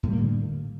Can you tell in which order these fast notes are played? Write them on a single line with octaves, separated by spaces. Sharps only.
A2 G3 A#3 D3